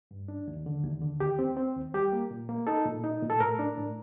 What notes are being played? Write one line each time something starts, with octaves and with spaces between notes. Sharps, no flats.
G2
D4
D#2
D3
D#2
D3
D#2 G4
C4
C4
D#2
G3 G4
A#3
A#2
A#3
D#4 A4
A#2
D#4
A#2
A4
A2 A#4
D4
A2